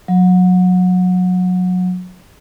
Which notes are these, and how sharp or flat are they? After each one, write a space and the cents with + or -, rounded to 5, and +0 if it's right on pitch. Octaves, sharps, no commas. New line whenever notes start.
F#3 -25